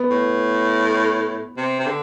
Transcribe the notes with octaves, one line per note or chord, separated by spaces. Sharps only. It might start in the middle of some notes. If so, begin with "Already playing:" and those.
Already playing: B3
A2
C3
C3
D3